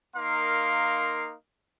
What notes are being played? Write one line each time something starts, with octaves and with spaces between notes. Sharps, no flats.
A#3 D#4 A#4 F5 C6